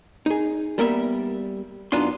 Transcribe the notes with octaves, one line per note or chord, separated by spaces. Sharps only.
D#4 G#4
G3 A#3 B3 A#4 E5
F#2 B3 D4 D#4 F4 C6